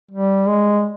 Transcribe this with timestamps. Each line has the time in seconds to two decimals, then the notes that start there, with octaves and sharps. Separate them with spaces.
0.11 G3
0.48 G#3